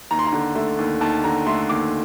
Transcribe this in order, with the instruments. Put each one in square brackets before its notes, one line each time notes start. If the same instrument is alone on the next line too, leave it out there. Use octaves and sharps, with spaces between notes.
[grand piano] D#2 A#5
C6
A#5
D3
A3
D#2
D#2 A5
D3 A#5
A3 C6
D#2 D6